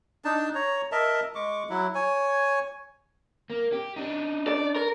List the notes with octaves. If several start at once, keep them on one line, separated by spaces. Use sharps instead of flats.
D4 D#4 A5
C#5 A#5
A#4 D#5 E5 A5
G#3 C#6 D6
F#3 E4
C#5 G#5
A#3
G4
D4 D#4
D5
A#4